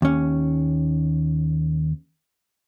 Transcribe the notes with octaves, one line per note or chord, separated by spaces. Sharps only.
D#2 C#4